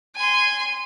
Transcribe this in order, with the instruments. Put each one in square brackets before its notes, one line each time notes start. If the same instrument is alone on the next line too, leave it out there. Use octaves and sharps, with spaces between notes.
[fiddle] G#5 C6